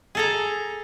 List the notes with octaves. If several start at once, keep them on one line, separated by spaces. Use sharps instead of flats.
G#4 A4 A#5